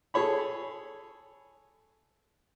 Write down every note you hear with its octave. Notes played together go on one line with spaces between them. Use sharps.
G#4 A4 C#5 B5